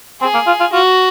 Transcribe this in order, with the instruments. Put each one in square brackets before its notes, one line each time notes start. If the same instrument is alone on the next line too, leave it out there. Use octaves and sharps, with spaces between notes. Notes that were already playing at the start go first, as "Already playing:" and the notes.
[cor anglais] C4 [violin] G#4
[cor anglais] A#3
F4
F4
[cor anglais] F4 [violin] F#4